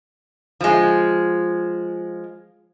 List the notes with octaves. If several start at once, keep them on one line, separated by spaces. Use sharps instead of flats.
F3 G#3